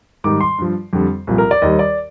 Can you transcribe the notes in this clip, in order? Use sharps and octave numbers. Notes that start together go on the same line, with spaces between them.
G#2 D#3 G3 D6
C6
G2 F3
F2 D3 G3
C2 A#2 F3
A#4
D5
D#2 D#3 G3 D#5
D5